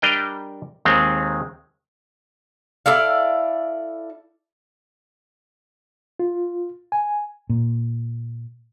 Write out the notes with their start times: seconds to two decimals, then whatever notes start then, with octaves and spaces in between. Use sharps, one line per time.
0.02 G3 D4 A#4 D#5 G5
0.85 D#2 D#3 G#3 C4
2.86 E4 A4 D5 F5
6.20 F4
6.92 G#5
7.49 A#2